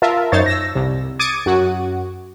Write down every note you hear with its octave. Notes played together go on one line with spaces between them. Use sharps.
F4 A#4 E5 A5
F#2 D#4 C5 C#5 A6
E6 A#6
C2
D6 D#6 G#6 A6 C#7 D#7
F#2 F#4